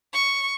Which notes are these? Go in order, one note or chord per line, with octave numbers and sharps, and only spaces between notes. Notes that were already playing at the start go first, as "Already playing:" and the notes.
C#6